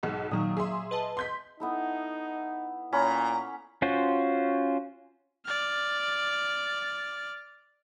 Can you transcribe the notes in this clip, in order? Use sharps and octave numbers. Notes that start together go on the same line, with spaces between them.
B1 G#2
A#2 D#3 F#3 D#6
G#4 E5 C6
B4 D#5 A5
C6 G6 B6
B3 D#4 E4 A4
A#2 C#4 A#5 B5
C#4 F4 F#4 C5
D5 F6